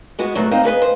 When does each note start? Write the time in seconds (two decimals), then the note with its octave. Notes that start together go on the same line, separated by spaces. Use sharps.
0.19 G#3 B3 F#4
0.35 B2 D#3 F#3 A3
0.51 A#3 C4 D#4 F5
0.64 B3 G#4 B4 D#5
0.82 C5